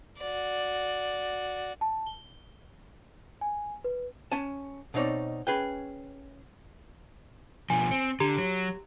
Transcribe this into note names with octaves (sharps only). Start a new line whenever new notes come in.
F#4 D5
A5
G7
G#5
B4
C#4 G#5 A5
B2 C4 D#4 C#5 D5
C#4 G#4 B4 G5
B2 F3 G#5
C4 C#7
D3 G4 A#5
F#3